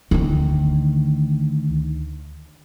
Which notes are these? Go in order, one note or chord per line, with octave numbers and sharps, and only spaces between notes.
D2 D#3